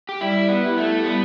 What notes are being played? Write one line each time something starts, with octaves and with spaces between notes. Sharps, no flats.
G4
G3 E4
B3
E4 G4
A3
G3 B3